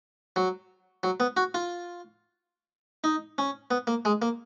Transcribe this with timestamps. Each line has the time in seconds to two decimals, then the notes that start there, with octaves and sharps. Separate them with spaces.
0.36 F#3
1.03 F#3
1.20 B3
1.37 F#4
1.54 F4
3.04 D#4
3.38 C#4
3.71 B3
3.87 A#3
4.05 G#3
4.22 A#3